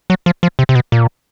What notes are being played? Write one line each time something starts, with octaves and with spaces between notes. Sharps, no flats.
F#3
F3
F3
C3
C3
B2
A#2